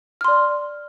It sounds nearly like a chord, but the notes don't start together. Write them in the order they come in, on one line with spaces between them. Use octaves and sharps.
F6 C6 D5